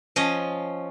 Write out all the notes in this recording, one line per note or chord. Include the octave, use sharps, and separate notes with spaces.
F3 C#4 D#5